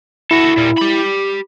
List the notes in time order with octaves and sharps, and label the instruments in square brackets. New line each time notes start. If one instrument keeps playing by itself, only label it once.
[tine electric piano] E4 [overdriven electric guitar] F#4 A4
[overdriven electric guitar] A#2 G3
G4 B5